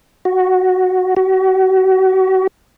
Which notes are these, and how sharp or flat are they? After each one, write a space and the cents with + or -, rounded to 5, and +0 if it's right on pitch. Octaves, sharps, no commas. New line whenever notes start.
F#4 +0
F#4 +35